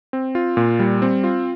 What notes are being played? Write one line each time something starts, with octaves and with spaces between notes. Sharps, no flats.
C4
F4
A#2
G3
C4
F4